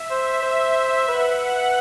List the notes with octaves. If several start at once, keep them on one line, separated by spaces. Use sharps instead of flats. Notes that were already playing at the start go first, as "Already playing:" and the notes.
Already playing: E5
C5
C5
B4 F#5